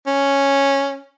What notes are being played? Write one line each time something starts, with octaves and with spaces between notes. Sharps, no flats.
C#4